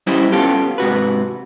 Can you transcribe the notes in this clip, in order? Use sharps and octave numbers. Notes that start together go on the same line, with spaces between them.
G3 C#4 E4 C5 D#5
B3 C#4 F4 G4 A4
G#2 C3 F#4 B4